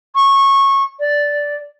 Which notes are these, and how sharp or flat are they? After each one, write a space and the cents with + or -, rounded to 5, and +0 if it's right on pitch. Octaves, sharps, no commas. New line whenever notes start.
C#6 -20
D5 -5